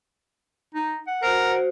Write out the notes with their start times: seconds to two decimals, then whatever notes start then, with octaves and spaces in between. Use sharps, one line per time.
0.75 D#4
1.07 F#5
1.23 F#4 A#4 C5